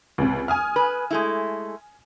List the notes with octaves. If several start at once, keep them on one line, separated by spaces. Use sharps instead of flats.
C#2 C3
G#5 D#6 F6
B4
G#3 A3 E4